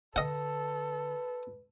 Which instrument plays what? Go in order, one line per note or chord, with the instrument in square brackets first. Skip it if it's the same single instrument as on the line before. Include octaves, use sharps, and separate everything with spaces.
[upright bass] D3 [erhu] A4 [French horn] B4 [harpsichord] D#5 F#5